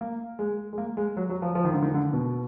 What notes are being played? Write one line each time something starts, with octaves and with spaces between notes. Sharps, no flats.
A#3
G#3
G#3
A#3
G#3
F#3
F#3
F3
F3
D#3
D3
D#3
D3
B2